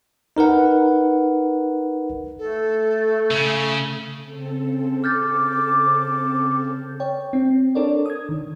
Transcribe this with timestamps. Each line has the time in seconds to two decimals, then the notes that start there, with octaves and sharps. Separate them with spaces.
0.37 D#4 A#4 B4 F#5
2.39 A3 A4
3.31 C#3
4.22 C#3 C4 A4
5.04 D6 F6 G6 A6
7.00 C#5 G5
7.33 C4
7.75 D4 A4 A#4 C#5 D5
8.06 D#6 G#6
8.29 D#3